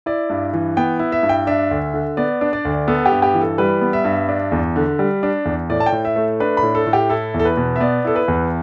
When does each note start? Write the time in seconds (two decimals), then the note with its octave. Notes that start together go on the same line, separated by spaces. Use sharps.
0.06 E4 D5
0.30 G2
0.53 E3
0.77 B3 G5
0.99 E4
1.12 E5
1.23 G2
1.29 G5
1.47 D4 E5
1.71 D2
1.94 D3
2.17 B3 D5
2.41 D4
2.53 D5
2.65 D2
2.88 B3 A4
3.06 G4
3.12 G2
3.22 G4
3.34 E3
3.41 A4
3.58 G3 B4
3.81 B3
3.93 E5
4.05 G2
4.29 D4
4.52 E2
4.76 D3
4.99 G3
5.23 D4
5.45 E2
5.70 A2 D5
5.80 A5
5.86 G5
5.92 A2
6.05 E5
6.16 A3
6.40 D4 B4
6.57 B5
6.63 A2
6.75 A4
6.86 A2
6.93 G4
7.10 E4 A4
7.34 E2
7.39 A4
7.45 B4
7.57 B2
7.76 E5
7.80 B3 D5
8.05 E4 A4
8.16 B4
8.28 E2